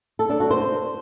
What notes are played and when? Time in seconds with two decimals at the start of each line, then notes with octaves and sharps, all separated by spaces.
0.19 A4
0.30 D4
0.40 F#4
0.51 C5